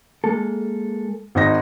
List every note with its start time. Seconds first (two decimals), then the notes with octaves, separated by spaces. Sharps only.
0.24 G#3 A#3 A4
1.35 G#1 D#4 A#6